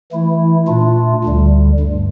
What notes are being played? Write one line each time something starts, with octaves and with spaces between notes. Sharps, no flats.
E3 A3 E4
A#2 A3 D4 F4
D2 D3 G3
G2